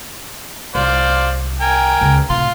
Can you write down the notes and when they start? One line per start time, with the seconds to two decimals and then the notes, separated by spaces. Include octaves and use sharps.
0.75 C2 C5 D5 F5
1.61 A#4 G5 G#5
2.01 C#2 C#3
2.30 A2 C3 F4 C6